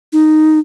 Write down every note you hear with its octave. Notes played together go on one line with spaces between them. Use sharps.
D#4